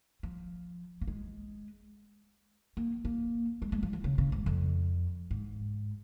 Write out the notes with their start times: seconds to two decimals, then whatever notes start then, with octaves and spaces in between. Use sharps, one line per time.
0.23 F3
1.01 A#3
1.07 G#3
2.77 A#3
3.05 A#3
3.62 G#3
3.72 G#3
3.83 F3
3.93 F3
4.04 C#3
4.18 C#3
4.32 G#2
4.46 F2
5.31 G#2